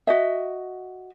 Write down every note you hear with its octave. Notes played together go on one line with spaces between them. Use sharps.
F#4 D#5 E5